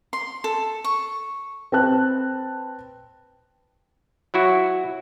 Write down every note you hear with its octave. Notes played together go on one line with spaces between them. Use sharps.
C6
A4
C#6
C4 B4 A5 F#6
F#3 E4 F#4